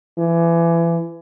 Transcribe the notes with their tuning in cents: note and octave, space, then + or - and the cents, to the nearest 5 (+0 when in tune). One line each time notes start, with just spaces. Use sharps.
E3 +30